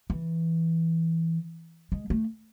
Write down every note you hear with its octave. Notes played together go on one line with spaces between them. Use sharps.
E3
G#3
A3